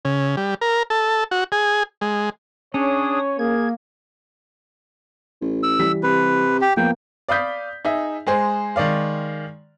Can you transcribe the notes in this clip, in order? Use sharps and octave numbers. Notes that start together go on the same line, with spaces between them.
C#3
G3
A#4
A4
F#4
G#4
G#3
C#4 D4 G#4 C#5 D#6
A#3 G#4 G#6
A1
E6
E3 G3 B6
C3 B4
G4
F3 A#3 B3 G5
D5 F5 B5 D#6 G6 B6
D#4 G#4 E5
G#3 G#4 C5
D#3 G#3 D5 F5